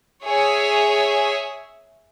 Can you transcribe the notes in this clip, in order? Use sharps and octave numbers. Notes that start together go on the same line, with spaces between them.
G#4 C#5 E5